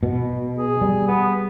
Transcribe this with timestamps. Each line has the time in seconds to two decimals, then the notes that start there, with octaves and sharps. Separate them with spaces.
0.03 B2
0.58 G#4
0.81 G3
1.07 B3